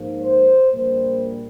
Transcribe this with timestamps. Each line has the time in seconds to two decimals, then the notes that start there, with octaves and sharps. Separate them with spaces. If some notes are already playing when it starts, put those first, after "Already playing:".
Already playing: G#2 F3 A#3
0.21 C5
0.72 A#1 A#2 G3 A#3 C5